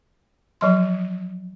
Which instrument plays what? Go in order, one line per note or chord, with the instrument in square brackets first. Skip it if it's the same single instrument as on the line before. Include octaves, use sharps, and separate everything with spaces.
[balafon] F3 F#3 C6